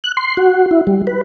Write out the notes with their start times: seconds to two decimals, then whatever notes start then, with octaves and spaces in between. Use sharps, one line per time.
0.04 F#6
0.17 C6
0.37 F#4
0.71 E4
0.87 G3
1.07 B4